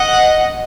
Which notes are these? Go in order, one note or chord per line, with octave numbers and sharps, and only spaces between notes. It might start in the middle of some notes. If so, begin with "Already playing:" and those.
Already playing: D#5 F#5